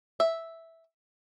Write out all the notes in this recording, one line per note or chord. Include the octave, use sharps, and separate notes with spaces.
E5